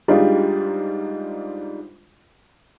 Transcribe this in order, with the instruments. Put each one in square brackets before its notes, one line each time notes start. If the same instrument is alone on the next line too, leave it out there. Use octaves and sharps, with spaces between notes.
[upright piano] G#2 G3 G#3 D4 D#4 F4